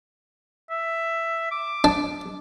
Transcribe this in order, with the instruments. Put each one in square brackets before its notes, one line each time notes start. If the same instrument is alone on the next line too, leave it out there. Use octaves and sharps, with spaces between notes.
[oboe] E5
D6
[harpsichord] D4